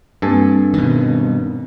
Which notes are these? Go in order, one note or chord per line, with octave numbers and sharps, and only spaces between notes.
G2 A#3 C4 A4 G#5
B2 D#3